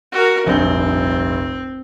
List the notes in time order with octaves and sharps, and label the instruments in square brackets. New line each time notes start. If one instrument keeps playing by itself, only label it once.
[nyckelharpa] F#4 A#4
[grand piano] F1 A#1 G2 [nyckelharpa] C4